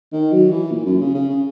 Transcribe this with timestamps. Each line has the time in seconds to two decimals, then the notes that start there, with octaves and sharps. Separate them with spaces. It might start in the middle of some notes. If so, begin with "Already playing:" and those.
0.12 D#3
0.32 F#3
0.51 E3
0.71 A#2
0.85 F#2
1.01 C#3
1.15 C#3
1.30 C#3